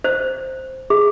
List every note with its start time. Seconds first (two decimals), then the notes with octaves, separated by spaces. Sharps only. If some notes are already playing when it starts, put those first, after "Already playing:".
0.04 C5
0.90 G#4